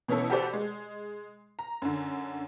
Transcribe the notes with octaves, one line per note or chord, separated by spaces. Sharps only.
B2 E3 C#4 E4 A4
F#4 G4 A4 B4 C5 D5
G#3
A#5
F#2 D3